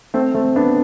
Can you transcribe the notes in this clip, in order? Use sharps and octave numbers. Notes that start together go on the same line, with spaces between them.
A3 C4
A3 C4
B3 D4